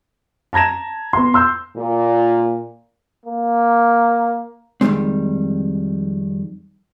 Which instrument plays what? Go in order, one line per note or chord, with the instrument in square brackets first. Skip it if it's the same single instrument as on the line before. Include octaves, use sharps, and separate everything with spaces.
[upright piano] A5 A#5 G#6 A#6 E7
B3 C6
C6 E6 G6
[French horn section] A#2
[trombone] A#3
[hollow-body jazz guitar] F2 D#3 E3 G3 G#3 C4